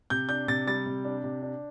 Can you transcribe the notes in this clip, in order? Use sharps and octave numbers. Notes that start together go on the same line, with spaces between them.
C3 G6
D4 G6
C3 A6
G3 A6
C3
D4
C3
D4